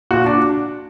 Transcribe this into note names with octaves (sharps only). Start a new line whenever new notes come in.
A#2 F#4
D4